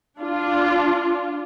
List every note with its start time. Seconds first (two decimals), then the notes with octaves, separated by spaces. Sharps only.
0.20 D4 F4